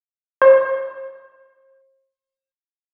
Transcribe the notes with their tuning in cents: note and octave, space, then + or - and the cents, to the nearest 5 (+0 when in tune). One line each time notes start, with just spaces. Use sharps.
C5 +40